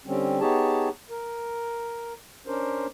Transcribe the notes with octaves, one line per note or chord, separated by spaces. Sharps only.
D3 G3 C4 C#4
B3 D#4 G4 G#4 C#5 A5
A#4
C#4 D4 A#4 C5